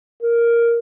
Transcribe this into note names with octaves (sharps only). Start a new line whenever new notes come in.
A#4